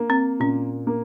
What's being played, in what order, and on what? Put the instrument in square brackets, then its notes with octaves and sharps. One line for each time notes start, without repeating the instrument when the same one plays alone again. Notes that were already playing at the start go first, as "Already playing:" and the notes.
Already playing: [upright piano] A#3
[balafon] C4
[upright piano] A#2 [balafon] C#4
[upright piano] A#3